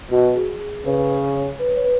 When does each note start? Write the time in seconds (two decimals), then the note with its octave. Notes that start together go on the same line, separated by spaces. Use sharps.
0.11 B2 F#4
0.36 G#4
0.60 G#4
0.85 C#3 B4
1.10 C#5
1.35 C#5
1.59 B4
1.76 C#5
1.84 B4